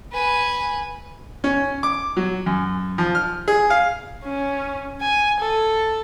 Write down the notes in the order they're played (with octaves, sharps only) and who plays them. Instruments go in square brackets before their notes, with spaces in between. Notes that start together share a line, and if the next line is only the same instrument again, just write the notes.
[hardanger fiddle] B4 G#5
[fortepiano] C#4
D6
F#3
F#2
F3
F6
G#4
F5
[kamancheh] C#4
G#5
A4